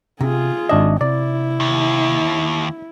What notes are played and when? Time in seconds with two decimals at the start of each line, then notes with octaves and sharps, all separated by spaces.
0.21 C3 F4 G#4
0.69 G#1 D4 D#5 E5
1.01 C3 E4 D5
1.60 D#2